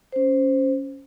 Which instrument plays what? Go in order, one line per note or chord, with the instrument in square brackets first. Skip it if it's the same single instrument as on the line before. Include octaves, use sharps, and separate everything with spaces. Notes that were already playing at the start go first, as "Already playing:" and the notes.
[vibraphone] C#4 C5